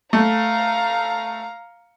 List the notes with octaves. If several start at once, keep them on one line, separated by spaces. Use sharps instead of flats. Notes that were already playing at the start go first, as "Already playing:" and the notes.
A3 F5 A#5